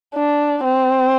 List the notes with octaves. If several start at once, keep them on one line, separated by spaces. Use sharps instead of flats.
D4
C4